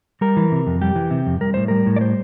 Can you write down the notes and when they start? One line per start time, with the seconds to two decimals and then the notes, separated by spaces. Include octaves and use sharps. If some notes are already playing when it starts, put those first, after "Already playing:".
0.21 G3 A#4
0.37 E3
0.52 C3
0.67 F2
0.81 G3 G4
0.96 E3
1.11 C3
1.27 F2
1.41 G3 A#4
1.54 A2 C5
1.68 G3 A#4
1.86 A2
1.96 D5
2.01 G3 C5